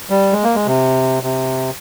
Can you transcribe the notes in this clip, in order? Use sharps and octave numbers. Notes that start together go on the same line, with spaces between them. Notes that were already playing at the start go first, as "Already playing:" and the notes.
G3
G#3
A#3
G#3
C3
C3